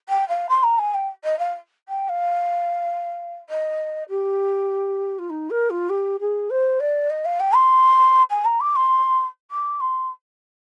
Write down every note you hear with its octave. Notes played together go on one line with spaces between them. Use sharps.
G5
F5
C6
A#5
G#5
G5
D#5
F5
G5
F5
D#5
G4
F4
D#4
A#4
F4
G4
G#4
C5
D5
D#5
F5
G5
C6
G#5
A#5
D6
C6
D6
C6